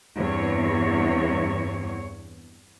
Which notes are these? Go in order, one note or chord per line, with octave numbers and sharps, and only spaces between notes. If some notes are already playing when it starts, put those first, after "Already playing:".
E2 G2 C4 C#5